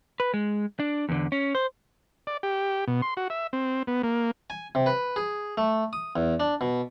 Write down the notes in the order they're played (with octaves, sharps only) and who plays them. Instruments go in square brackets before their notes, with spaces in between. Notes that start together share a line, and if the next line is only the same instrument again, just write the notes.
[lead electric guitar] B4
G#3
D4
E2 D3
C#4
C5
[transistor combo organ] D5
G4
B2
C6
F#4
E5
C4
B3
A#3
[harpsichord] G#5
C3
B4
G#4
A3
D#6
E2
D4
B2